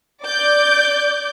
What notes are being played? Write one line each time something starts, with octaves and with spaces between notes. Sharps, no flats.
D5 D6 G6